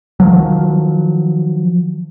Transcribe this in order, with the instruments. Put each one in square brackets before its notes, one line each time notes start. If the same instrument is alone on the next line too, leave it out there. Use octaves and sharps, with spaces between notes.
[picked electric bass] D#3 F3 F#3